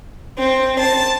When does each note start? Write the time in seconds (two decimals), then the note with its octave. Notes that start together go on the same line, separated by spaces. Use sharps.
0.40 C4
0.80 A5